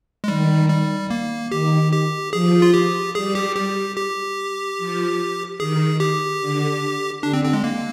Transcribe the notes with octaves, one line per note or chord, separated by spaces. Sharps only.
G#3
D#3 G3
G3
A#3
D#3 G4
G4
F3 G#4
F4
G4
G3 G#4
G4
G4
G4
F3
D#3 G#4
G4
D3
D3 D4
C4
C4
G#3
A#3